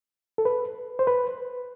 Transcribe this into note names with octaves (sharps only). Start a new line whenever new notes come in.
A4
B4
C5
B4